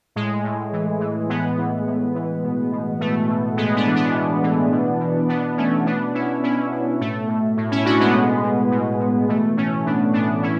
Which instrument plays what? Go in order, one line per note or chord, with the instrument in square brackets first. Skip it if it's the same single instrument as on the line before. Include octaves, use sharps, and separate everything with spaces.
[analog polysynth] A2 G#3
A2
E3
E3
A2 G#3 B3
E3
A2
E3
B2
B2
B2 A3
B2
A2 G#3 B3
B3 D4
E3
B3 D4
A2
E3
B2
B2
B2 B3 D4
B2 A3 C#4
B2 B3 D4
B2 C#4 E4
B2 C#4 E4
B2
A2 A3
A2
A2
C#4 E4
A2 D4 F#4
G#3 B3
B2
B2
B2
B2
E3 A3
A2 A3 C#4
E3 B3 D4
A2 B3 D4
E3 C#4 E4